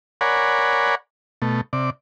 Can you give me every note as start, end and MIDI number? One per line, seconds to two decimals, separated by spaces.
0.21 0.95 70
0.21 0.95 73
0.21 0.95 74
0.21 0.95 78
0.21 0.95 80
0.21 0.95 83
1.42 1.61 47
1.42 1.61 57
1.73 1.90 48
1.73 1.90 74